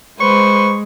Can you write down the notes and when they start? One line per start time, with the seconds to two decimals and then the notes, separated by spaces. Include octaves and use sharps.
0.20 G#3 B4 C5 C#6